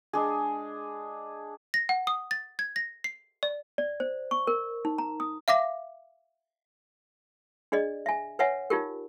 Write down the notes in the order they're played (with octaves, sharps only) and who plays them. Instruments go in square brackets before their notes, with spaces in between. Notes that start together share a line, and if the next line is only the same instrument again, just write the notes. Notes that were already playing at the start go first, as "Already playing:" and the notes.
[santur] G#3 D4 G#4
[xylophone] A#6
F#5
D#6
A6
G#6
A#6
C7
D5
[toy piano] D5
C5
C#6
A#4
D#4
A#5
D#6
[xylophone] E5 F5 D6 A#6
[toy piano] D4 G#4 D5 D#5
E5 G#5
B4 C#5 E5 F#5 G#5
D#4 F4 G4 A#4